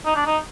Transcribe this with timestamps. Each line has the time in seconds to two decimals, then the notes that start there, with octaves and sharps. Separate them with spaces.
0.06 D#4
0.15 D4
0.26 D#4